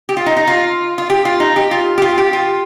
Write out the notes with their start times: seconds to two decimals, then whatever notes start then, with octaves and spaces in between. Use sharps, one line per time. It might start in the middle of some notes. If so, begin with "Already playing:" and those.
0.09 G4
0.17 F4
0.26 D#4
0.37 D#4
0.47 F4
0.98 F4
1.10 G4
1.25 F4
1.40 D#4
1.56 G4
1.71 F4
1.98 G4
2.02 F4
2.18 G4
2.33 F4